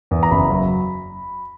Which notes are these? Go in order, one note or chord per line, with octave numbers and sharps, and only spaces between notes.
E2
A#5
F#1 B5
F#3